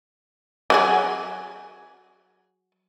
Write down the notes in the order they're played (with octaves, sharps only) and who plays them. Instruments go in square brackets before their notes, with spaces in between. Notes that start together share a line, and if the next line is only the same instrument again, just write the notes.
[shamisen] F#3 F#4 G#4